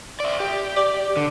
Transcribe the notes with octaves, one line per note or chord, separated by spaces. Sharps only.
D5 E5
G4
D5
D3